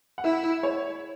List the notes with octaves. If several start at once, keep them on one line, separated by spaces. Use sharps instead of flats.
F#5
E4 E5
C#5